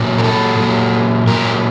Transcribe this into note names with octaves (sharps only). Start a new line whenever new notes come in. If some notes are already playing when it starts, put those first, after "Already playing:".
Already playing: A#2 F#3
A#4
A4
A#2 F#3
A#2 F#3 A#4